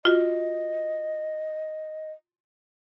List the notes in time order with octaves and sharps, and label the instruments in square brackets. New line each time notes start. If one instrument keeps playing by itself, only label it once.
[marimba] F4 F#4 [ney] D#5